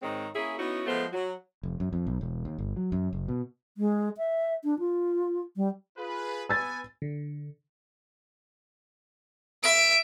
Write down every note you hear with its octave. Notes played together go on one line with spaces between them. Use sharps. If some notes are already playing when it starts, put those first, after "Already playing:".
G#2 D#3 G#3 C4 C#5
A#3 C#4 E4 G#4
B3 C#4 D#4 E4 F#4
F3 G#3 A3 B3 C5
F#3
F1
F#2
F2
B1
E1
D#2
G1
F#3
F#2
F#1
B2
G#3
E5
D4
F4
G3
F4 G#4 B4
B3 B4 G#5 E6 A6
D3
E5 D7